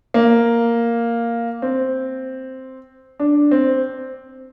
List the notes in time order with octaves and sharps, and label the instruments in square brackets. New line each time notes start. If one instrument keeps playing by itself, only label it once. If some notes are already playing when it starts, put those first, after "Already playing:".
[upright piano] A#3
C4
D4
C4